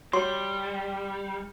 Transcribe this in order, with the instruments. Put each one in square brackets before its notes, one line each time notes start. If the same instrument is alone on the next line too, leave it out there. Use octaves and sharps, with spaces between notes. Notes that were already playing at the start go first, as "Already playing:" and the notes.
[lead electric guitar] G3 [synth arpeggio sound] F#4 C#5 [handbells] C6